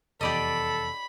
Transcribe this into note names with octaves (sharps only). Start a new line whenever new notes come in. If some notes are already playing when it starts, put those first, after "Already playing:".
F1 E2 G4 A4 D5 D#5 B5